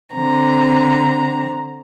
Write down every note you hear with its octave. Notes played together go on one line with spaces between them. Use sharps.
D3 C4 A#5